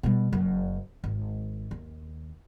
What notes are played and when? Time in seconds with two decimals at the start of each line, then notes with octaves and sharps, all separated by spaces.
0.03 B2 G3
0.32 F#1 F#2
1.04 G#1
1.71 D#2